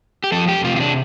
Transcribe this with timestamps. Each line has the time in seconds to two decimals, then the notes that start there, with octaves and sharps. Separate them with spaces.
0.24 G4
0.32 F3 A4
0.48 F2 G4
0.64 C3 F4
0.76 F4
0.80 D4